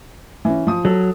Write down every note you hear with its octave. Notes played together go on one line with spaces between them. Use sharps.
E3 C#4
F3 D#6
F#3 A4